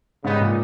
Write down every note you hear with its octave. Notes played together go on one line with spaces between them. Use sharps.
G#2 C#3 G3 B3 D#4
A#2